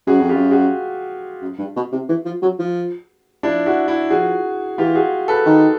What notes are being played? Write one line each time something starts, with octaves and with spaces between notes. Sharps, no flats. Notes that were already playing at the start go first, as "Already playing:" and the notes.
F#2 F#4 G#4
F2
F#2 F4 G4
F#4 G#4
F#2
G2
B2
C3
E3
F3
F#3
F3
F3 D4 E4
E4 F#4
E4 F#4
F3 F#4 G#4
E3 F4 G4
F#4 G#4
A4 B4
D#3